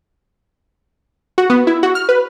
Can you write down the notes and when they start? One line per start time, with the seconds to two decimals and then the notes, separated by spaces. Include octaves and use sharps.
1.38 F#4
1.50 B3
1.67 E4
1.83 F#4
1.95 F6
2.09 B4